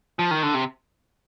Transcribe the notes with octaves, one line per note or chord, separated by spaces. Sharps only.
F3
D#3
D3
C3